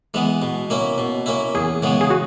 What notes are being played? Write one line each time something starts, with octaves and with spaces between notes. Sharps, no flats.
E3 G#3 B3
B2
A#3 C#4 E4
B2
A#3 C#4 E4
E2 G#4
C#3 E3 G#3 B3
G#4
F#4